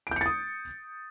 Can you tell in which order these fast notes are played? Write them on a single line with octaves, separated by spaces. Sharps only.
D7 G6 C#7 A6 D#6